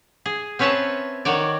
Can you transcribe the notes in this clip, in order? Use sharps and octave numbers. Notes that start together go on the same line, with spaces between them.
G#4
C4 C#4 B4 C#5 E5 A5
D#3 F#4 C#5 D5